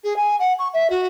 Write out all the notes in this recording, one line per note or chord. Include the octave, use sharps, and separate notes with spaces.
G#4
G#5
F#5
C#6
E5
F#4